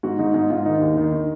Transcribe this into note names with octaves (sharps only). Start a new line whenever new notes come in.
G#2 F#4
G#2 D#4
G#2 D#4
G#2 F4
D#3 D#4
D#2
D#3 D#4
D#3